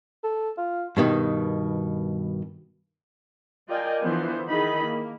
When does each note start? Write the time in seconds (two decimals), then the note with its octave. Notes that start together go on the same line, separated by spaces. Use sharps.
0.24 A4
0.58 F4
0.97 G2 B2 D#3
3.68 F4 A#4 D5 D#5 G5 G#5
4.02 D3 E3 F3 B3 E4 C5
4.48 D#3 D#4 E4 G#4 D#5 B5
4.85 A#3